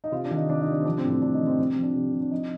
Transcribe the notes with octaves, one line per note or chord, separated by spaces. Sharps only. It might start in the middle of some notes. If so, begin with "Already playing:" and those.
D#4
C3 F4
D4
D#3
D#4
C3 D4
D#4
C3
D4
C4
F3 D4
C4
A2
C4
A2 D4
D#4
F3
C4
C3 C4
C4
F3
D4
C3
C3
D4
F3 D#4